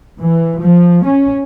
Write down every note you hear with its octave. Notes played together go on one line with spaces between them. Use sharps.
E3
F3
C#4